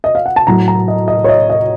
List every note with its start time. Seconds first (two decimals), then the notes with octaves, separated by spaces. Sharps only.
0.04 D#5
0.15 F5
0.26 F#5
0.36 A5
0.47 A2 F#3 A#5
0.68 A#5
0.88 D#5
1.08 D#5
1.24 C#5
1.29 D#5
1.50 D#5